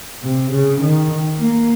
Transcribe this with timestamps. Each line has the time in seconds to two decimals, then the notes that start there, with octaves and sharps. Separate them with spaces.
0.23 C3
0.52 C#3
0.81 D#3
1.39 A#3